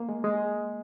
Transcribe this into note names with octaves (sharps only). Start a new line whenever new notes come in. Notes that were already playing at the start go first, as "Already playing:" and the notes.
Already playing: A#3
G#3
G#3